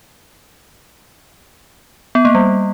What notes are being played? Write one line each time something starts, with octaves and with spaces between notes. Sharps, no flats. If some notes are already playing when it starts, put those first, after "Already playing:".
B3
A#3
G3